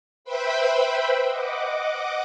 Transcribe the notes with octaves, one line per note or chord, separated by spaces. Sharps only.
B4 C5 E5 G5 B5
D#5 F#5 D6